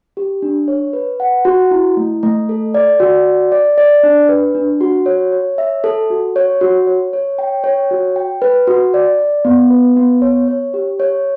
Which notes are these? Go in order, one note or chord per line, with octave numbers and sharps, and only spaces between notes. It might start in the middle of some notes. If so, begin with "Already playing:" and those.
G4
D4
C#5
B4
F#5
F#4
E4
A3
A3
A4
D5
F#4
D5
D5
D5
D4
B4
D4
F#4
C#5
C#5
E5
A4
F#4
C#5
F#4
C#5
C#5
G5
C#5
F#4
G5
B4
F#4
D5
D5
B3
B4
B3
C#5
C#5
G4
C#5